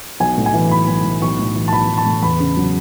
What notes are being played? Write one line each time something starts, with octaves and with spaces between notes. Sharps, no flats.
B1 G#5
A2
G#5
E3
B1 B5
B1
A2
B1 C#6
A2
E3
A5
B1 B5
B1
A5
A2
E2 B5
C#3
F#3